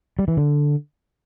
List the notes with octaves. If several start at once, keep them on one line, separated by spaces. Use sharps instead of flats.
G3
E3
D3